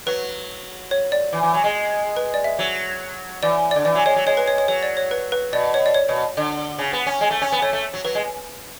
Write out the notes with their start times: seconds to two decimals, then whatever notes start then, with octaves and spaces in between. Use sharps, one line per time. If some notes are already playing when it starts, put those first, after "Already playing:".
0.07 F#3 B4
0.91 C#5
1.12 D5
1.33 E3
1.43 E3
1.54 F#3
1.64 G#3
2.17 B4
2.34 D5
2.44 E5
2.59 F#3
3.43 E3 D5
3.71 D5
3.76 D3
3.85 E3 D5
3.95 F#3
4.05 G#3 C#5
4.16 F#3
4.26 G#3 C#5
4.37 B4
4.47 C#5
4.58 C#5
4.68 F#3 C#5
4.83 D5
4.97 C#5
5.11 B4
5.32 B4
5.53 B2 D5
5.74 C#5
5.86 D5
5.95 C#5
6.09 B2
6.37 D3
6.79 C#3
6.93 B3
7.06 C#4
7.21 G#3
7.31 A3
7.41 C#4
7.52 B3
7.62 A3 C#5
7.73 A3
7.94 F#3
8.05 F#3 B4
8.15 G#3